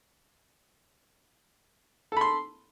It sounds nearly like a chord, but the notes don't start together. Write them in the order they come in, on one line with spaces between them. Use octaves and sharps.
A4 B5 C6